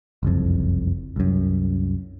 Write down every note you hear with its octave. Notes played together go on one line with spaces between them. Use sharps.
F#1 C2 F2
C2 F#2